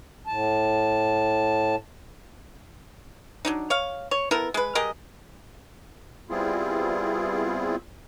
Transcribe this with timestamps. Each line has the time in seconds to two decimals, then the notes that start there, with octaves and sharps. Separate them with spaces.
0.27 A2 A5
3.45 F#3 D4 D#4
3.70 C#5 F5
4.11 C#5
4.31 B3 E4 A4 A#4
4.54 G#3 B4
4.75 G#3 G4 A#4 D#5
6.30 G3 B3 C4 E4 F4 G#4